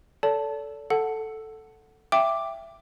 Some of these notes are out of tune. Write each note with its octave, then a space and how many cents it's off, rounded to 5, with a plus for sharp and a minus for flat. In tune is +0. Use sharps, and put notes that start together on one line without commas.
A4 +0 D5 -45 A5 +0
A4 +0 F#5 +0 A5 +0
E5 +15 G5 +0 D6 +0